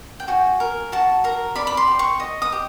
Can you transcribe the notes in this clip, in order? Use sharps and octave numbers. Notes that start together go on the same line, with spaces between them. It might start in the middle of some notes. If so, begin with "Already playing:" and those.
G5
F#4 G#5
A#4
F#4 A5
A#4 A#5
D5 B5
B5
C6
G4
C#6
D#5
D#6
G4